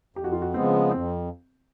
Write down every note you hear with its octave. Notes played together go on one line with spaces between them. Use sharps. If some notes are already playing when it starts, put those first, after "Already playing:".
F2 G4
F#4
F4
F#4
C#3 F3 G#3 B3 C4
F2 C4